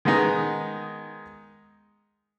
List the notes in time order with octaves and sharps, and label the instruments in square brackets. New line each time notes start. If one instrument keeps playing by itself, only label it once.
[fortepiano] D#3 G#3 B3 D#4